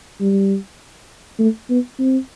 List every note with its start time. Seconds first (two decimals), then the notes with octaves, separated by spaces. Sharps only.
0.21 G3
1.39 A3
1.70 B3
1.99 C4